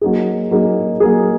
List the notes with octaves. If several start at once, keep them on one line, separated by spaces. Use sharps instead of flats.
F#3 A#3 D#4 G#4
F#3 A#3 D#4 G#4
F#3 A#3 D#4 G#4